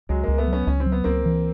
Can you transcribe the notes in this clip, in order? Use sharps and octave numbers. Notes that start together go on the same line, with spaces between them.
C#2 F#3 G#3
C#2 G#3 A#3
A#3
A3 B3
F#3
B3 C#4
C#2 C#4
C4
F#3
B3
C#2 A#3 C4
E3